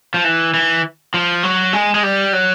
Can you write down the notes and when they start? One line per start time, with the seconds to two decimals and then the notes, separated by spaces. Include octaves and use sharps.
0.14 F3
0.24 E3
0.54 E3
1.14 F3
1.43 F#3
1.73 G#3
1.94 G#3
2.03 G3
2.33 F#3